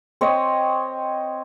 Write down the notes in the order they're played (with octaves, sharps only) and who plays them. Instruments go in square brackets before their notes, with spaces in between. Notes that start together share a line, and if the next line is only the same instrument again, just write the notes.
[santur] C4 C#5 D#5